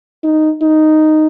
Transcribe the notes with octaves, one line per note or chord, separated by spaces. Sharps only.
D#4
D#4